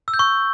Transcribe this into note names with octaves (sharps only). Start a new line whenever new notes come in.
E6
G6
C#6